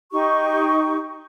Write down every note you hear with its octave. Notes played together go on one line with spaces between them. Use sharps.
D#4 G4 C#6